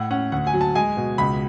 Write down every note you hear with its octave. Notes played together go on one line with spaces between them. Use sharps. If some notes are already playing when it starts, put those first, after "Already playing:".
Already playing: A2 F#5
C#4 F#5
D2 F#5
G#5
F#3
A5
G#3 G#5
B2
C#2 B5